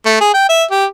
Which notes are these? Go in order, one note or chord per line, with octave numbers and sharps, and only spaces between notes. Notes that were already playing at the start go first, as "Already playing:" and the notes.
A3
G#4
G5
E5
G4